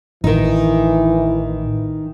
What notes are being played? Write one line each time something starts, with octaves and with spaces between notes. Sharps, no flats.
A1 D#3 E3 D#4